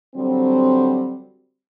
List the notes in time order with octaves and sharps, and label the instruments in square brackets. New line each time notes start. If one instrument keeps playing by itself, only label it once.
[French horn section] D3 F#3 G3 C4